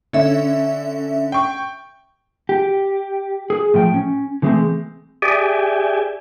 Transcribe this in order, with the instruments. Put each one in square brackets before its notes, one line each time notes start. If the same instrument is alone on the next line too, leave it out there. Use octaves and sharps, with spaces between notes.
[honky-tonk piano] D3 [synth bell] C#4 E5
[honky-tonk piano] G5 C#6
[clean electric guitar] G4
G#4
A2 F3 G5
C#4
D3 E3 G#3 A3 C4
[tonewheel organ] G4 G#4 D5 E5 G5 G#5